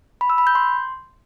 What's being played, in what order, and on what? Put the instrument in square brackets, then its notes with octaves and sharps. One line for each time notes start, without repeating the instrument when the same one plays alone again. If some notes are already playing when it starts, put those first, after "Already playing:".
[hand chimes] B5
E6
B5
G6
C6